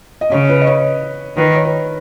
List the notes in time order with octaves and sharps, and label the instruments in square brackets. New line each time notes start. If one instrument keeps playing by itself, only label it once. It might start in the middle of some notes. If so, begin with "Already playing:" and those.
[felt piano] D#5
[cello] C#3 [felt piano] C#5
[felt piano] B4
D#5
C#5
[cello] D#3 [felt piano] B4
[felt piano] C#5
B4